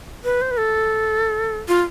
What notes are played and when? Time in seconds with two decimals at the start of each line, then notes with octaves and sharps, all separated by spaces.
0.24 B4
0.42 C5
0.51 B4
0.57 A4
1.68 F4